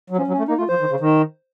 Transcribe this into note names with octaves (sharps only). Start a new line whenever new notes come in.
F#3
F3 C#4
F#3
C#4
A3
A#3 D#4
A3 F4
F3 C5
D#3
C#3
D#3